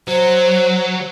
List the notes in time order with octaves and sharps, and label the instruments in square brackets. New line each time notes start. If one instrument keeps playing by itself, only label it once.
[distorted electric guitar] F#3 [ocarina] C5